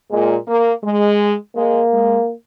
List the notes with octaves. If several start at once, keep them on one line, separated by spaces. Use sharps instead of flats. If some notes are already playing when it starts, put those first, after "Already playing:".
A#2 G#3
A#3
G#3
G#3 A#3
G#3